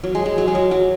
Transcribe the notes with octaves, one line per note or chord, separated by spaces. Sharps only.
F#3
G#3
G#3
F#3
G#3
F#3
F#3